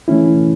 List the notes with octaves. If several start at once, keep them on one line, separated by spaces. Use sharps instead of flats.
E3 A3 C#4 E4